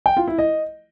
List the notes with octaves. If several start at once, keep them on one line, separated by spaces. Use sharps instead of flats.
G5
F4
E4
D#5